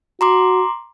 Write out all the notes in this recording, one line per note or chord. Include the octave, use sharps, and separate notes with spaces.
F#4 A#5 C6 D6